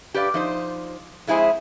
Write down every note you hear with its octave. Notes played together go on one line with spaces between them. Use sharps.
G4 B4 D5 F5
F3 D#4 C5
F2 G#3 E4 G#4 C5